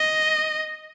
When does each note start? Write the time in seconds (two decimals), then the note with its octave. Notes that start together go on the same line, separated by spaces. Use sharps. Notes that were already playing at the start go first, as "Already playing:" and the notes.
Already playing: D#5